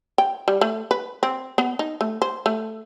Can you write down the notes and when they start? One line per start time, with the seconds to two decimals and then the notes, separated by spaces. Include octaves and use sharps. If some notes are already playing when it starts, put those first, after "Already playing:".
0.18 G5
0.48 G3
0.61 A3
0.91 B4
1.23 C4
1.58 B3
1.79 D#4
2.01 A3
2.22 C5
2.46 A3